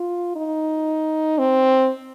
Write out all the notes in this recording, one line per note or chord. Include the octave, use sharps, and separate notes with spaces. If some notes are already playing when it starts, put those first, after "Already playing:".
Already playing: F4
D#4
C4